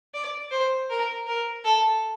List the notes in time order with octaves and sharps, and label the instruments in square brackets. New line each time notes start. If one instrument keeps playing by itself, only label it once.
[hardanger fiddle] D5
C5
A#4
A#4
A4